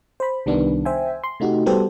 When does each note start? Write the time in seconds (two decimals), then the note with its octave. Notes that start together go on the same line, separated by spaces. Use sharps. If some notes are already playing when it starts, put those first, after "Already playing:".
0.20 C5 B5
0.46 C2 D#3 G3 B3 D4
0.85 C5 E5 G5 G#5
1.24 C6
1.40 C3 A3 D#4 F#4 G4
1.66 G3 B3 F#4 G4 A4 C5